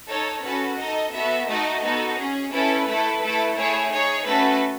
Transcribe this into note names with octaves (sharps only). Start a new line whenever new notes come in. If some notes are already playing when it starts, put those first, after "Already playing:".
D#4 A4 C#5
C#4 F#4 A4 B4
D#4 A4 D#5
B3 F#4 A4 E5
A3 D#4 F#4 A4 D#5
B3 D#4 F#4 A4
C#4 G#4
C#4 E4 A4 B4
A3 E4 A4
A3 E4 A4
A3 E4 G#4 C#5
D#4 G#4 C#5
A3 C#4 F#4 A4 B4